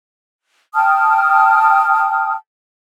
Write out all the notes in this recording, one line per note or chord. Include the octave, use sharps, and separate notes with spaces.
G5 A5 D#6 F6